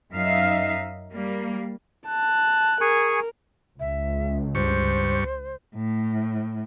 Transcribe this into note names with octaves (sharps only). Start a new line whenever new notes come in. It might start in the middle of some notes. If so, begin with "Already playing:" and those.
F#2 D#4 E5 F5
G3 A#3
A5 F#6
G#4 A#4 G#5 C#6
C#2 E5
G2 C5 C#6
A2